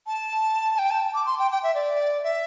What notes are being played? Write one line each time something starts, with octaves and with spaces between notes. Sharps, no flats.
A5
A5
G5
A5
D6
C6
G5
G5
E5
D5
E5